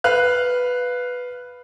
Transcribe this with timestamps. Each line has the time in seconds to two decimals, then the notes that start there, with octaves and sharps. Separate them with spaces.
0.04 B4 F5 F#6